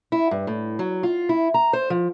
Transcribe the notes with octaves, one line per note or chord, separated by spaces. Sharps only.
E4
G2
A2
F#3
F4
E4
A#5
C5
F3